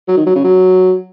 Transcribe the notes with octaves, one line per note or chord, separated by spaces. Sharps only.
F#3
D#3
F#3
C#3
F#3